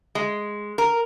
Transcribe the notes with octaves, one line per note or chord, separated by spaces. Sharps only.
G#3
A#4